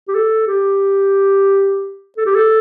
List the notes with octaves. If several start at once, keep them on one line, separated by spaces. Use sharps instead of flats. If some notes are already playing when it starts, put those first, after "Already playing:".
G4
A4
G4
A4
G4
A4